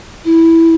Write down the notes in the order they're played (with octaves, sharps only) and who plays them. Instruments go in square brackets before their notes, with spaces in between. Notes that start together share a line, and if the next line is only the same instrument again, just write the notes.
[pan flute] E4